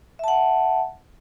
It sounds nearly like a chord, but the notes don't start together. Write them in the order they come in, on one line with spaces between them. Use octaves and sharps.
E5 A5 F#5